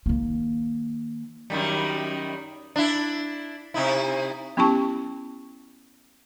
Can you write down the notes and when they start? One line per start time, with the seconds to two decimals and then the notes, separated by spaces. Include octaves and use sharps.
0.06 D#3 A#3
1.50 F#2 D#3 G3
2.76 D4 E4
3.74 C3 D#4 E4
4.57 B3 C#4 E4 G4 A5 C#6